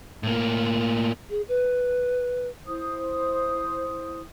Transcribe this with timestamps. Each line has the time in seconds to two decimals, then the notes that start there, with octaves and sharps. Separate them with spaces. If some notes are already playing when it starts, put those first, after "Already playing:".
0.23 A2 A#3
1.30 G#4
1.48 B4
2.66 E4 C5 D#6